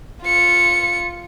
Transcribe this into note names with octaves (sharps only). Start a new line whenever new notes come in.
F4 C#7